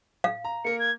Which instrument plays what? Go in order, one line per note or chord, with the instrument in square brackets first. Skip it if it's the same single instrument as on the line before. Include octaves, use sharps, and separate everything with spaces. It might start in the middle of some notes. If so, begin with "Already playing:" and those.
[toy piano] F5
[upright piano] A#5
[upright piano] A#3 A#4 [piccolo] C#7
[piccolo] G#6